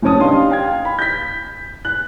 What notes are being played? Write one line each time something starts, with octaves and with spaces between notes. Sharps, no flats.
C2 F#2 C#4 C#5 A5 D#6
D4 D#4 G4 F5 C6
F5 G5 G#6
B5
G6 B6
F#6